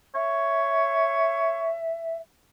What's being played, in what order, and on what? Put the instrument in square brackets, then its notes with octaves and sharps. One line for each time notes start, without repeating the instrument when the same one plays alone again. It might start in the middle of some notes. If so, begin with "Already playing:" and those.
[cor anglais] C#5 [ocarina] E5